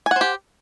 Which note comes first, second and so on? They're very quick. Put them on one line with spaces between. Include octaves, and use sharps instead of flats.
G#5 F#5 C5 G4